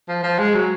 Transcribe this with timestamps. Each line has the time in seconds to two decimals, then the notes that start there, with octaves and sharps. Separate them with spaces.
0.08 F3
0.23 F3
0.39 G#3
0.54 F#3